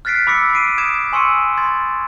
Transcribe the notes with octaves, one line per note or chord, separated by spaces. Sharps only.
F6 F#6 A6 B6 C7 D7
B5 D6 E6 A#6 C#7
C7 D7 D#7
D#6 G#6 D7 E7
G#5 C6 C#6 E6 C#7 D#7
C6 G#6 A6